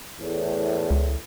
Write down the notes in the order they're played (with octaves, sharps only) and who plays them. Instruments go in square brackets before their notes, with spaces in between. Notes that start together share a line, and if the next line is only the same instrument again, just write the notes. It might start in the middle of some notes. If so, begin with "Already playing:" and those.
[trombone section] E2 A2
[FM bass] C#2